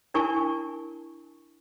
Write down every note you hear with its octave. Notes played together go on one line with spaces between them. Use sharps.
D4 E4 A#4 G#5 A5 C#6